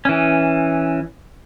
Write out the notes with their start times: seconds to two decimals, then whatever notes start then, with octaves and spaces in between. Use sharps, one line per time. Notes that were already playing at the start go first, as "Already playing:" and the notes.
0.05 E3 C#4